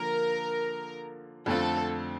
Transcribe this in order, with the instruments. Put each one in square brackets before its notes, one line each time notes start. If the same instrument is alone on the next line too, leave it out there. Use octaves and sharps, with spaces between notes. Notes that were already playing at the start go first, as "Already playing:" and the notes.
Already playing: [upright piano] D3 F3 A#3 [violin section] A#4
[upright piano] F2 D3 A3 C4 F4 [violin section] A4